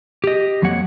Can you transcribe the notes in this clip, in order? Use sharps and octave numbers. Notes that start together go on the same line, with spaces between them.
G4 D#5
F2 F#3 A#3 C#5 F#5